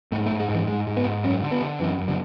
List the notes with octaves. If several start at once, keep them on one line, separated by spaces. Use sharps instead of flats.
G#2 A3
A3
G#2
G#3
G#2
E3
G#2 G#3
G#2
B3
G#2
F#2 C#4
D3
B3
D3
F#2 E3
F#2
D3